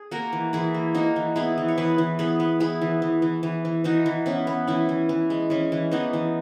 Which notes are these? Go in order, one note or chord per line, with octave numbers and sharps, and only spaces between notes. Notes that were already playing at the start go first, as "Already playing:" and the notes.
Already playing: G#4
A#3 F#4 A#4
E3
E3 E4 G#4
A#3
A#3 D#4 F#4
E3
B3 E4 G#4
E3
C#5
E3 G#4 B4
E3
B3 G#4 B4
B3
B3 E4 G#4
E3
E3
E3
E3
E3
E3 D#4 F#4
E3
B3 C#4 E4
B3
E3 C#4 E4
E3
E3
G#3
E3 C#4
E3
E3 B3 D#4
E3